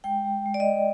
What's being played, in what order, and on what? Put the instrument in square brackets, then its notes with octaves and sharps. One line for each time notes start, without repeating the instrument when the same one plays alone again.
[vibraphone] G#3 G5
G#3
G#3
D5
D#5
G#3